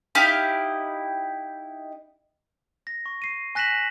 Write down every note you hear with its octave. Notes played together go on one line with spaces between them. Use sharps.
D#4 E4 G4 F5
A#6
C#6
C7 D#7
G#5 F#6 A#6 B6 E7 F#7